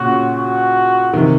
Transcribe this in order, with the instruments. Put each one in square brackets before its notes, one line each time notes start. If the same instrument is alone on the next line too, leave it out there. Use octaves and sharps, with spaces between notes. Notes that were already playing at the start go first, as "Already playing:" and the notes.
Already playing: [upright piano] A#2 C#3 [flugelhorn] F#4
[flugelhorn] F#4
[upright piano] C3 D#3